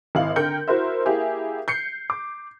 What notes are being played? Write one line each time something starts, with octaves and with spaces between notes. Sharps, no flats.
G#1 E4 F5 F#7
D3 A#4 G5 G6 C#7
E4 F#4 A#4 C5 E5
A#3 E4 G4 G#4
G6 C7 C#7
D6